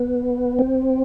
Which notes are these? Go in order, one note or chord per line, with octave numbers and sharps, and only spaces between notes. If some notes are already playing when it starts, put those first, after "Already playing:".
Already playing: B3
C4